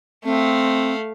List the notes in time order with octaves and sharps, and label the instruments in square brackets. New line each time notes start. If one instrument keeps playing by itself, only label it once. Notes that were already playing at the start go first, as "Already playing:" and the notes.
[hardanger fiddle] A3 F5 [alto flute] C4